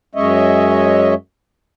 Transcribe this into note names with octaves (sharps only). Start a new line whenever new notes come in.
F#2 G#3 C#4 C#5 D#5 E5